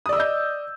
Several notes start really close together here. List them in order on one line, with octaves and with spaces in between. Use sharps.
D#6 D5 E6 D#5 G6